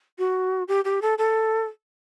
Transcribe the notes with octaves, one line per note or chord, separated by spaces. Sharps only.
F#4
G4
G4
A4
A4